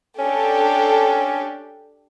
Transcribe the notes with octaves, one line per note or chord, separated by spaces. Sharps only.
C#4 D4 G4 A4